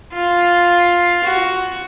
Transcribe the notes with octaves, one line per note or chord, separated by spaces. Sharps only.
F4
F#4